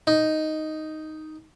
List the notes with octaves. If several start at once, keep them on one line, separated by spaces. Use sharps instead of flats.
D#4